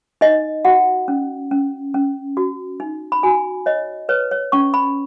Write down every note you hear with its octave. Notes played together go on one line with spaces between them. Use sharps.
D#4 D#5
F#4 F#5
C#4
C#4
C#4
F#4
D#4
B5
F#4 G#5
C#5 D#5
B4 C#5
C#5
C#4 C#6
B5